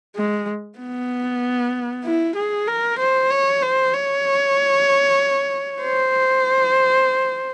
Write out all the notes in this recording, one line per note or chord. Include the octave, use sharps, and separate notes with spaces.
G#3
B3
E4
G#4
A#4
C5
C#5
C5
C#5
C5